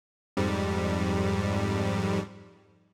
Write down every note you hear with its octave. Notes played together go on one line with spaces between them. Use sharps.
F2 G#2 G3